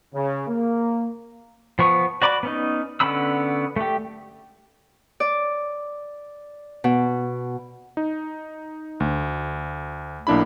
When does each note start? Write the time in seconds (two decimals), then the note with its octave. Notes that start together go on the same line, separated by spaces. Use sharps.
0.14 C#3
0.48 A#3
1.79 F3 B3 C#6
2.22 F#4 D5 B5 D6
2.43 B3 C#4 D#4
3.00 D3 B3 C#4 B5 E6
3.76 A3 G4
5.20 D5
6.84 B2
7.97 D#4
9.00 D2
10.27 B1 A#3 D4 E4 B5